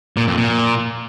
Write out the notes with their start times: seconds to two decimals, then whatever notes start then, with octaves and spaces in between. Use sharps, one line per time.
0.17 A#2
0.27 F2
0.38 A#2